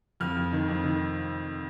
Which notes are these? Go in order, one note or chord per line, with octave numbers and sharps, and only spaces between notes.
F2 F6
F2
D#3
F2
D#3